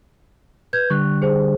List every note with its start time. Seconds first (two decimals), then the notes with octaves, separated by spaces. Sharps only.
0.73 B4 G6 G#6
0.90 D3 G3 C#6 F#6
1.22 G#4 C5